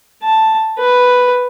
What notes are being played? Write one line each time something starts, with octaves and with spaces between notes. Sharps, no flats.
A5
B4